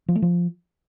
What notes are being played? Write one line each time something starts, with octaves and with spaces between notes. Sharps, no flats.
F3
A3
F3